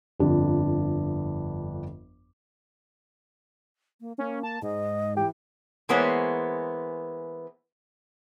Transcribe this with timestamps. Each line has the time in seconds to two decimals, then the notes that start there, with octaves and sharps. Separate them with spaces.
0.20 G1 F2 D4
4.01 A#3
4.18 A#3 C#4
4.43 A5
4.62 G#2 D#5
5.17 E3 G4
5.89 E3 G#3 A#3 B3 C5 C#5